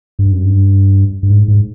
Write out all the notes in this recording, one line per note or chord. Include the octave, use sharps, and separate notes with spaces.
G2
F#2
G2
G2
G#2
G#2